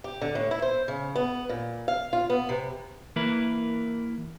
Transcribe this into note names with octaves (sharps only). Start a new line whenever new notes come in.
G4
D3
A2
E4
C5
C#3
B3
A#2
F5
F4
B3
C3
E3 A#3 E4 A#4 B4